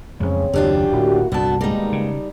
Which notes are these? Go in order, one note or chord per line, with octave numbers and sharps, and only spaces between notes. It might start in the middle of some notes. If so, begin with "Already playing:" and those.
A1 F2 C#3 G#3 C4 C#5
F#1 D#2 F#3 C#4 D4 F4 G4
D1 A#3 E4 F#4
C2 G2 A#2 D3 B3 D4 F#4 A5
B2 D#3 G3 G#3 A#3 D#4
C#3